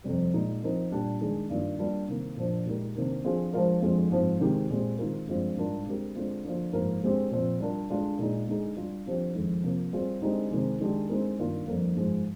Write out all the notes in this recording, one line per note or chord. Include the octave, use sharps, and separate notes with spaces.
F2 C3 G3
A#2 G#3 D#4
F3 C4 D#4 A#4
A#2 G3 D4 G4
D#3 G#3 D4 G#4
G2 D#3 A#3 F4
G3 A#3 D4 F4
C3 D#3 A#3
A#2 F3 A#3 D4
A#2 G#3 D#4 G4 A#4
C3 D#3 A#3 D4
D3 F3 C4 F4 G#4
F3 G#3 D4 F4 A#4
F2 D3 G#3 C4 F4
G#2 F3 C4
C3 D#3 G#3 C4 G4
A#2 G#3 C4 G4
D#3 G#3 C4 F4 A#4
G2 F3 G#3 C4 F4
G#2 G3 D4 F4 A#4
D3 G#3 C4 G4 A#4
D3 G#3 C4 F4
D3 F3 A#3 F4
G#2 F3 A#3 F4 A#4
D3 G#3 C4 G4
A#2 F3 C4
G3 D4 F4 A#4
D3 G#3 D4 F4
A#2 G#3 D#4 G#4
D3 G#3 D#4 G#4
G3 D4 F4
D3 F3 C4 G4
F2 D#3 G#3
C3 F3 A#3
G3 C4 F4 G#4
D3 G#3 C4 D#4 G4
C3 D#3 G#3
D#3 G#3 D4 G4
D3 G#3 C4 D#4 A#4
G2 D#3 A#3 F4
F2 D3 G3 A#3
G#2 F3 G#3